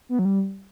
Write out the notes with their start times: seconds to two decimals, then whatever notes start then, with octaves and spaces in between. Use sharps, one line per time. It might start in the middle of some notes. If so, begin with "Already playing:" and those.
0.09 B3
0.19 F#3
0.25 G3